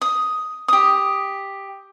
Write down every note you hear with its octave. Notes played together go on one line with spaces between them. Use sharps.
D#6
G4 D#6